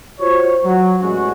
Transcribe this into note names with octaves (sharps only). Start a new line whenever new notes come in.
F4 F#4 C5 C#5
F#3
A1 E2 G#3 C#4 F#4